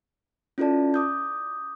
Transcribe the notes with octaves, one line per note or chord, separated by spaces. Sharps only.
C#4 E4 F4 A4 D5 A5
D6 D#6 G6